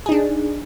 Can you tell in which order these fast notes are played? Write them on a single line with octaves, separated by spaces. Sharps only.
G#4 D#4 D4